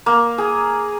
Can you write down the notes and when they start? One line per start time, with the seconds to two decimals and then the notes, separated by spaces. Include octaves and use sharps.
0.06 A#3
0.38 G#4